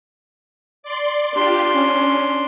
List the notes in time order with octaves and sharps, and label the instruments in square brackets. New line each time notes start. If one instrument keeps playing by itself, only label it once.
[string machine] D5 C6
[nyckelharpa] D4 C6 [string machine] F4 G4
[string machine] C#4